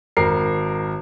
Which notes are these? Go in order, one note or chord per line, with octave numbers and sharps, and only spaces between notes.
G#1 A#4 C7